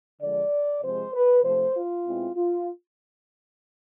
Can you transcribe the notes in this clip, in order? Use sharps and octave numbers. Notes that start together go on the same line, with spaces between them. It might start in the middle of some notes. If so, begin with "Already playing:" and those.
D3 F3 G#3 D5
C3 F3 G#3 C4 C5
B4
C3 F3 A3 C5
F4
B2 G#3 C4 E4
F4